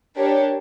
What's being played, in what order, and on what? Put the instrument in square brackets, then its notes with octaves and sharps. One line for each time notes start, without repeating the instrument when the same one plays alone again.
[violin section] D4 G4 A#4 C#5